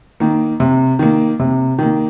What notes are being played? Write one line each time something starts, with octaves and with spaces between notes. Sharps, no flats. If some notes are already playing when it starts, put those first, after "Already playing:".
D#3 A#3
C3
D#3 A#3
C3
D#3 A#3